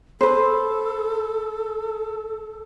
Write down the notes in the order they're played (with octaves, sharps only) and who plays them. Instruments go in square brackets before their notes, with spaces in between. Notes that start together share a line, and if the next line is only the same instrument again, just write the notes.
[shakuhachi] A4 [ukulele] B4 C5